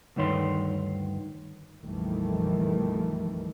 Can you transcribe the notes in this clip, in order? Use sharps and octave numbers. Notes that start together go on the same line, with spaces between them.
D2 G2 D#3 C#5 C6
A#1 F2 D#3 E3 G3 A3